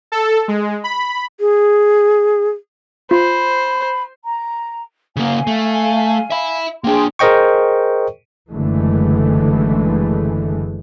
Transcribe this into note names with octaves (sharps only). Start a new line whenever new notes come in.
A4
G#3
B5
G#4
F4 C5 B5
A#5
C#3 A#3 F5 G#5
A3
E5 B5
A#3 D4 G#4 G5 C6
G#4 A#4 C5 D#5 G5 C#6
F#1 D3 E3 G#3 A3